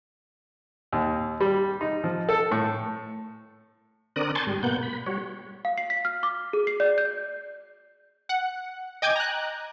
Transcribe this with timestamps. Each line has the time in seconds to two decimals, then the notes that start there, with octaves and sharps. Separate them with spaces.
0.93 D#2
1.41 G3
1.81 D#4
2.04 F3
2.29 A4
2.51 A2
4.16 D3 C4 A#4 D5 D#6 F#6
4.35 G#5 A5 C6 C#6 G6 A6
4.47 G#2 G3
4.63 B2 A#3 B3 F#5 G6
4.83 B5
5.06 G3 F#4 C#5
5.65 F5
5.78 C7
5.90 B6
6.05 F6
6.23 D6
6.53 G#4
6.67 C7
6.80 D5
6.98 G6
8.29 F#5
9.02 D#5 G5 G#5 D6 G6 G#6
9.16 A#5 F#6